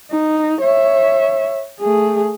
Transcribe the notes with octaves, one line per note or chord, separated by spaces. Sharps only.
D#4
C#5 E5
A3 G#4